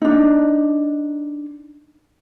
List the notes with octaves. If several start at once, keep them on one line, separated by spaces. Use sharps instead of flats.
D4 D#4